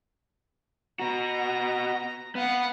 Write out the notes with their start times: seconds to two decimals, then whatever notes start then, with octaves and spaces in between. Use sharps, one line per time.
0.99 B3 F#4 A#5
2.35 B3 F5 F#5